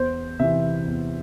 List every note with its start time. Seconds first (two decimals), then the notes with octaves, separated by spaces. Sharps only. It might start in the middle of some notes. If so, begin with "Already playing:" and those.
Already playing: E2 C5
0.39 C3 E3 E5
0.86 E2